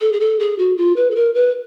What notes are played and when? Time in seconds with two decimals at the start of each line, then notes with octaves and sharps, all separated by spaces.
0.01 A4
0.12 G#4
0.20 A4
0.39 G#4
0.58 F#4
0.77 F4
0.96 B4
1.11 A4
1.15 A#4
1.34 B4